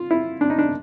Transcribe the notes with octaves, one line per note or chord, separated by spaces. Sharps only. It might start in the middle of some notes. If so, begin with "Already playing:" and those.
Already playing: F4
E4
D4
D#4
D4